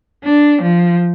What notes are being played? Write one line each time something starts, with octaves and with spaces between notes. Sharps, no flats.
D4
F3